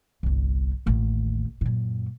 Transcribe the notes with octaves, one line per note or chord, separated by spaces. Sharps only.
G1 C2
A1 D#2
F#2 A#2